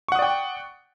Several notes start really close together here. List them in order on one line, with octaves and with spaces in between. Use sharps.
C#6 F#5 D#6 D5 G5